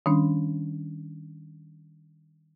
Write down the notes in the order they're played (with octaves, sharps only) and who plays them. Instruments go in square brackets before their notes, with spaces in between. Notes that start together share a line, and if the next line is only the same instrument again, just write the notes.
[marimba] D#3 G3 C#4 D4